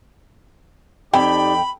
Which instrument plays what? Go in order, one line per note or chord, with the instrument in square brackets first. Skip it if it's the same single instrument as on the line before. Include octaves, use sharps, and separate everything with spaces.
[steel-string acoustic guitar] F2 [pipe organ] D#4 G4 D5 [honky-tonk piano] G5 [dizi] B5